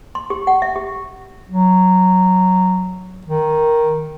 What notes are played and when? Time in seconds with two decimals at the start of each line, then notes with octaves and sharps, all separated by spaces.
0.15 C6
0.30 G4
0.47 F#5
0.62 E5
0.76 G4
1.49 F#3
3.26 D#3